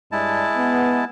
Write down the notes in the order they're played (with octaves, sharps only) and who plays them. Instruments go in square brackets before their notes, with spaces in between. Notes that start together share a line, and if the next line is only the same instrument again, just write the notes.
[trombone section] G2 D4 [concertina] G#3 E4 A5
[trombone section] B3